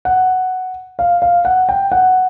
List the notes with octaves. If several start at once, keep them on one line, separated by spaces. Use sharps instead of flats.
F#5
F5
F5
F#5
G5
F#5